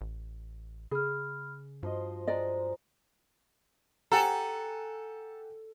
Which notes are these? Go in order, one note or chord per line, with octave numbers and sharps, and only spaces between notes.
A1
C#3 G#4 B5 F6
G2 F3 F#4 C5 D#5
G#3 D5 D#5 A#5
G4 A4 F#5 G#5 A#5